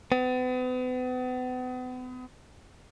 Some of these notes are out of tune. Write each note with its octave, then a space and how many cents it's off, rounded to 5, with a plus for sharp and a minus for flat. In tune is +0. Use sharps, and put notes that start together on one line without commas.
B3 +40